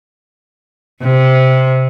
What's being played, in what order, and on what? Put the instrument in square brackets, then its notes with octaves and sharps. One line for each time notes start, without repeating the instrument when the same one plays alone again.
[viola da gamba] C3